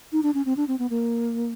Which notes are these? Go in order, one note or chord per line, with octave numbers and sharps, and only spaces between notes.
D#4
D4
C#4
C4
D4
C4
B3
A#3